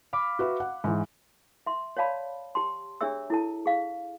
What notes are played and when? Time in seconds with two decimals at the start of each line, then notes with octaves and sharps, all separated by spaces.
0.13 F5 B5 D6
0.39 F#4 B4 E5
0.60 F#5
0.84 G#2 E3
1.66 E5 C6
1.97 C#5 D5 F5 A5 B5
2.55 G4 A5 C6
3.01 D4 G4 G#4 C#5 E5 E6
3.30 E4 A4 A5
3.66 G#4 F5